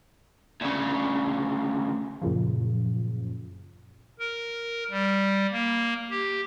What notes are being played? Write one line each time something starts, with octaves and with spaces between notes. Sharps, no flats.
D2 C#3
F#2 A#2 C#3 F3
A#4
G3
A#3
G4